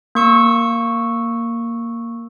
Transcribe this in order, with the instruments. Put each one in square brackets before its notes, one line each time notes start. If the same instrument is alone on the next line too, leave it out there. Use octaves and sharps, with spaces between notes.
[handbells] A#3 C#6 E6